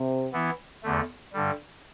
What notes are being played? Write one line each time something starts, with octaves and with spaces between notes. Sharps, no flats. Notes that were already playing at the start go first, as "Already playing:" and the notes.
Already playing: C3
E3 B3 E4
E2 D3 A3
G2 D3 G3